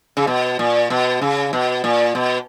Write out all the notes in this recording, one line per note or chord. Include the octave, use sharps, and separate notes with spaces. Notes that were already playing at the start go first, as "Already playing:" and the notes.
C#3
B2
A#2
B2
C#3
B2
A#2
B2